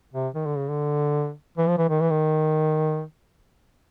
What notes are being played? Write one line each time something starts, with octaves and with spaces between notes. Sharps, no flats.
C3
D#3
D3
C#3
D3
E3
F3
E3
D#3
E3
D#3